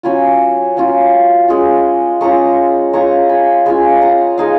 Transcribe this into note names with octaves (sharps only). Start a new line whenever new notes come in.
F#3 C#4 F4 G#5 B5
F#3 C#4 F4
G#3 C#4 F4
G#3 C#4 F4 A#5 C#6
G#3 C#4 F4 A#5 C#6
G#5 B5
G#3 C#4 F4 G#5 B5
F#5 A#5
G#3 D#4 F5 G#5